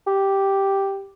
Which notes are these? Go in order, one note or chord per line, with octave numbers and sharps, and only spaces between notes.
G4